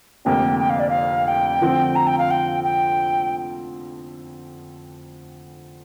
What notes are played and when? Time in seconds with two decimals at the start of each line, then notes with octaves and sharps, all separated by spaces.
0.25 F1 F2 D3 A#3 G4 G5
0.59 G5
0.70 F5
0.80 D5
0.89 F5
1.28 G5
1.62 D3 F3 C4
1.95 A#5
2.07 G5
2.18 F5
2.31 G5
2.64 G5